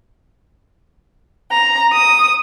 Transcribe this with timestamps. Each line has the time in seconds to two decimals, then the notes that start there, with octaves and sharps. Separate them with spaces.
1.51 A#5
1.92 D#6